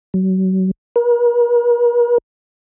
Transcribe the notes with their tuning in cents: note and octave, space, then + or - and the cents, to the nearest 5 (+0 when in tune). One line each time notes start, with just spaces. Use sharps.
F#3 +30
A#4 +45